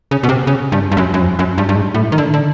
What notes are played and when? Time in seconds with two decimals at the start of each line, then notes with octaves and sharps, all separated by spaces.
0.11 C#3
0.23 B2
0.29 C3
0.47 C#3
0.72 G2
0.91 G2
0.97 F#2
1.14 F#2
1.21 F2
1.39 F#2
1.58 G2
1.69 G2
1.75 G#2
1.94 A2
2.12 D#3
2.18 D3
2.34 D3